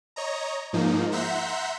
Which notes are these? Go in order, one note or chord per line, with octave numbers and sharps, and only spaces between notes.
C#5 D#5 A#5
G#2 F3 A#3 D#4
E5 F#5 A#5 C6 G6 B6